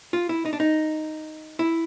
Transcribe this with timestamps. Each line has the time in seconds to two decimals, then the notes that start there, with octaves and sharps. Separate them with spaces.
0.13 F4
0.29 E4
0.46 D#4
0.53 D4
0.60 D#4
1.59 E4